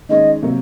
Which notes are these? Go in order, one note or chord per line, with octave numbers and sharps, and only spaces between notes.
D#3 G#3 C#4 D#5
C3 F#3 A#3